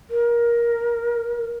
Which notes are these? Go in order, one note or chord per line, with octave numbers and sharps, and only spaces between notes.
A#4